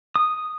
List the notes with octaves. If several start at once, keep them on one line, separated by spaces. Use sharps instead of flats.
D#6